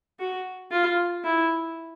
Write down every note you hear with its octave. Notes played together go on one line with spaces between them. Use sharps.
F#4
F4
E4